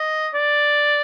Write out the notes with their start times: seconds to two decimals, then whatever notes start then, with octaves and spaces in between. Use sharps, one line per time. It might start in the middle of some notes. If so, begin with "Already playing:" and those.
Already playing: D#5
0.34 D5